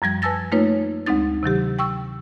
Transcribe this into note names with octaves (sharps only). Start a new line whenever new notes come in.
F#2 F3 G3 G#6
B4 G#5 A5 E6 A6 A#6
A3 A#3 D#4 F4 B4 C#5
D2 G#3 C4 D#4 A6
C3 D#3 F#3 G4
G5 C#6 E6